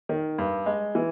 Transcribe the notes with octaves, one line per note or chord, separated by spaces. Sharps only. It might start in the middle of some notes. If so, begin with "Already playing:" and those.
D#3
G2
G#3
E3